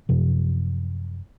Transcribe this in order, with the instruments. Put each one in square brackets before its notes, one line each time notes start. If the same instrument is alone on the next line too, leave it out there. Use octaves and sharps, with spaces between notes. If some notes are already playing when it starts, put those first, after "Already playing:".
[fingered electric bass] F#2 C3 F3